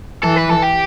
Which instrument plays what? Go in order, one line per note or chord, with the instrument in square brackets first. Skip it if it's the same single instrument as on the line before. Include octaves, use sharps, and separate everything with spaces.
[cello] E3 [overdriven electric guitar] A4
[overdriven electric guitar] B4
A4
G4